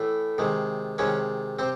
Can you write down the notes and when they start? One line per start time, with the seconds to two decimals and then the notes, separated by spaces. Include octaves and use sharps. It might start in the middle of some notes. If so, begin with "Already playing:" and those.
Already playing: A2 E3 A3
0.38 C3 D#3 G#3
0.98 C3 D#3 G#3 C#4 C#5
1.59 C3 C4 C5